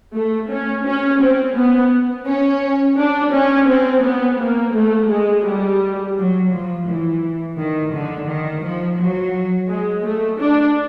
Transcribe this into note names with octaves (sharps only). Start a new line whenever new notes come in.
A3
C#4
C#4
C4
B3
C#4
D4
C#4
C4
B3
A#3
A3
G#3
G3
F#3
F3
E3
D#3
D3
D#3
F3
F#3
G#3
A3
D4